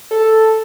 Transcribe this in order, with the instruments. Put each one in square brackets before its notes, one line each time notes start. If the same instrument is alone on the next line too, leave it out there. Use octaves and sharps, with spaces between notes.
[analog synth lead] A4